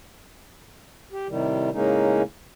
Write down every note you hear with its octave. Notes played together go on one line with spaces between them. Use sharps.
G4
A2 C3 D#3 G3
A2 C#3 G#3 A#3 C#4 D#4